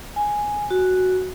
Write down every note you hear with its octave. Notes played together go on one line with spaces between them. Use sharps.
G#5
F#4